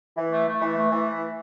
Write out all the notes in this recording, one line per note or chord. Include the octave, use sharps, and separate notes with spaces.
E3
A3
A3
E3
A3
E3